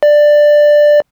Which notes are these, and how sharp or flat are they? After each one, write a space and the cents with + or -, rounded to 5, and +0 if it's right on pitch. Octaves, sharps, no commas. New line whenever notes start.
D5 +10